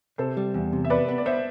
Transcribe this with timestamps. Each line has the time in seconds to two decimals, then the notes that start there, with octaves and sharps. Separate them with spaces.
0.18 C3 A4 C5
0.37 G3
0.54 E2
0.73 C3
0.84 E5
0.90 B3 B4 D5
1.09 B3
1.18 D5
1.26 B3 C5 E5